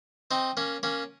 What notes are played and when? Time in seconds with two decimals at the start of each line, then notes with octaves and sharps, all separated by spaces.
0.31 C4 D#4
0.57 A#3 C#4
0.83 A#3 C#4